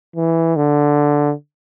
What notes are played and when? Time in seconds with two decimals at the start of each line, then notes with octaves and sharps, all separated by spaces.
0.16 E3
0.56 D3